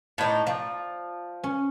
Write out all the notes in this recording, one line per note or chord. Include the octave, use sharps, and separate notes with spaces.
A2 D#4 D5 A5
F3 D5
C#4